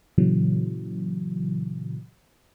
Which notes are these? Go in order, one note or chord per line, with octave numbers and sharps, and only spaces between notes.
A#2 C#3 E3 F#3